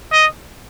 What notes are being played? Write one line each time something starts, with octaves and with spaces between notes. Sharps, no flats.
D#5